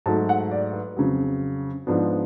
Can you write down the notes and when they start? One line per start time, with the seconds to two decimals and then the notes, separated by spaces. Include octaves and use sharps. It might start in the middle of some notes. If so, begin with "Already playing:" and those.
0.06 G#2 F#3 A3 A5
0.29 F#5
0.52 D5
0.73 B4
0.97 F2 C#3 F#3
1.87 G#2 F3 B3 D4